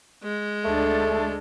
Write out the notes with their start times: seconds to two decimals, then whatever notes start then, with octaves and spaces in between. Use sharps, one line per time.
0.23 G#3
0.64 D2 A3 D4 A4